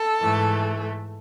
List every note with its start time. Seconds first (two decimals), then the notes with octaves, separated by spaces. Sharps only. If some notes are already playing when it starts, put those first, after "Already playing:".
Already playing: A4
0.21 G#2 E3 A3